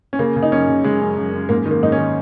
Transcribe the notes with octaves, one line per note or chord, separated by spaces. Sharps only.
C#4
C#3 A#3
C#3
D#4
F#2 C#4
C#3
C#3 G#3
F#2
F#2
F#2
G#2 A#3
D#3
A#3
G#2 D#4
C#4
D#3